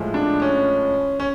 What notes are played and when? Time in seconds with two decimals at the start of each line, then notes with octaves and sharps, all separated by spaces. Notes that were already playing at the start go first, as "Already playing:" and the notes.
Already playing: A2 F3 G#3
0.14 D4
0.42 C#4
1.20 C#4